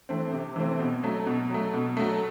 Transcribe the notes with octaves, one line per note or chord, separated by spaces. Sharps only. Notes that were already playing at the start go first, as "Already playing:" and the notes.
E3 A3 C4
C3
E3 A3 C4
B2
F#3 A3
B2
F#3 A3
B2
F#3 A3